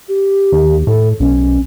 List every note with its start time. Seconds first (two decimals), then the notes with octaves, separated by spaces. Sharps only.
0.09 G4
0.52 D#2
0.87 A2 A4
1.20 B1 C#4